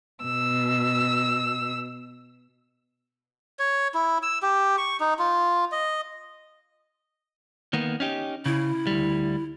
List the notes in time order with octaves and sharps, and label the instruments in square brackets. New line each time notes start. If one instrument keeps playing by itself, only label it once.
[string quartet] B2 E6
[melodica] C#5
E4
E6
G4
C#6
D#4
F4
D#5
[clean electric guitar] D#3 A#3 B3
C#4 D#4 G4
[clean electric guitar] C#3 [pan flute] E4
[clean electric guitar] D2 G3